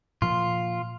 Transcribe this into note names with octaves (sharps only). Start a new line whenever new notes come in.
A#2 F3 F4